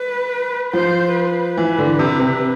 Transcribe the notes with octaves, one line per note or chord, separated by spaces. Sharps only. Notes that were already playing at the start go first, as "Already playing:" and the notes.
Already playing: B4
F3 C5
B4
E3
D3
C3
C3